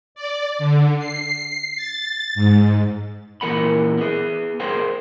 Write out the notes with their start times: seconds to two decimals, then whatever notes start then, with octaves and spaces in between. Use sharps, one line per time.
0.15 D5
0.59 D3
0.99 C7
1.76 A6
2.35 G#2
3.41 A#2 E3 A#4 F#5 B5
3.98 B3 G#4
4.60 G#4 A#4 C5 F5 G5